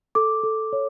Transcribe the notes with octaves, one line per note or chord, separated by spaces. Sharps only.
A4 D6
A4
C#5